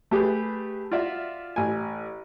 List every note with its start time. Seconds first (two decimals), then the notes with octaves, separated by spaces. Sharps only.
0.11 A3 G4 G#4 B4
0.92 F4 F#4 D5 E5
1.56 A1 G#5